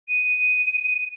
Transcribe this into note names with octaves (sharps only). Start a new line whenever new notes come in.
D#7